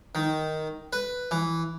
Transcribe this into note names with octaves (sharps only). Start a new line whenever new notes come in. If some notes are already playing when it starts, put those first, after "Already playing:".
D#3
B4
E3